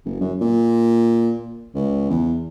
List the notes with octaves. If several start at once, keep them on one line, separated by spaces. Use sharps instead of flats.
F#1
F#2
A#2
C#2
E2